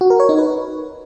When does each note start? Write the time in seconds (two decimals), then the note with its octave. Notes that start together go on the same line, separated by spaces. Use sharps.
0.01 F#4
0.10 A#4
0.20 C#5
0.29 D#4
0.38 B4